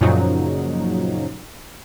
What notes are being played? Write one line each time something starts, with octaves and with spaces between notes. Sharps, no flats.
F#2 A#2 C#3 F3 F#3 D#4